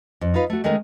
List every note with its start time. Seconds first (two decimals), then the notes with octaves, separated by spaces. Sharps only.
0.21 F2
0.34 D#4 F4 B4 F5
0.50 A3 F#4
0.64 D#3 G#3 A3 C#4 G#4 A#4